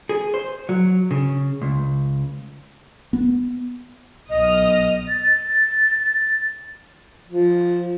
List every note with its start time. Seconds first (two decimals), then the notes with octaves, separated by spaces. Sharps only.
0.09 G#4
0.34 C5
0.69 F#3
1.11 C#3
1.62 C#2
3.13 B3
4.30 B1 D#5 D#6 F6
5.08 A6
7.28 F3